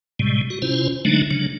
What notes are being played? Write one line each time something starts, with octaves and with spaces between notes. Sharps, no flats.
A2 C3 G3 G#3
F#4
C3 C#4 E4 F4 C5
D3 F#3 G#3 A3 D4 D#4
C#3 F#3 D4